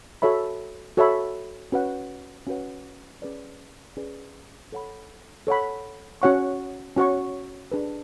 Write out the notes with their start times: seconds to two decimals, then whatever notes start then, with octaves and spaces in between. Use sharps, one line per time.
0.22 F#4 A4 C#5 E5 B5
0.97 F#4 A4 C#5 E5 B5
1.72 C#4 F#4 B4 F#5
2.47 C#4 F#4 B4 F#5
3.22 C#4 G#4 B4 D5
3.97 C#4 G#4 B4 D5
4.72 A4 C#5 F#5 B5
5.47 A4 C#5 F#5 B5
6.22 C#4 F#4 C#5 F#5 C#6
6.96 C#4 F#4 C#5 F#5 C#6
7.72 D4 G#4 B4